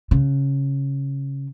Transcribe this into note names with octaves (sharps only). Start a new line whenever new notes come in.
C#3